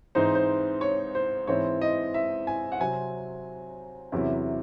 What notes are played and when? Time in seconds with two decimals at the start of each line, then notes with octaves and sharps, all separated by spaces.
0.15 G#2 E3 C4 D#4 C5
0.35 C5
0.81 C#5
1.15 C5
1.47 G#2 E3 C4 E4 C#5
1.81 D#5
2.14 E5
2.47 G#5
2.72 F#5
2.80 C3 F#3 C4 G#5
4.12 E2 C3 F#3 C#4 E4